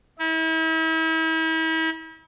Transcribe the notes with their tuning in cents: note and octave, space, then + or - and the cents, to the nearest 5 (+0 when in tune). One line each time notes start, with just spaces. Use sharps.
E4 -40